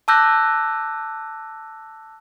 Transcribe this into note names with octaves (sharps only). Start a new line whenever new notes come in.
A5 D6 E6 F#6 G6 A#6